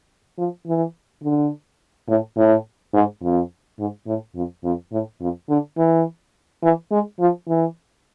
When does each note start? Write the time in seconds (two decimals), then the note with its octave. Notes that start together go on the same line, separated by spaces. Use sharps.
0.38 F3
0.66 E3
1.23 D3
2.08 A2
2.37 A2
2.94 G#2
3.22 F2
3.79 G#2
4.07 A2
4.35 F2
4.64 F2
4.92 A2
5.21 F2
5.49 D3
5.78 E3
6.63 E3
6.91 G#3
7.19 F3
7.48 E3